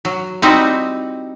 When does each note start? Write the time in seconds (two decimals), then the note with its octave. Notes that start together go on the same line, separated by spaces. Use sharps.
0.05 F#3
0.42 G3 C4 D#4 E4 F#4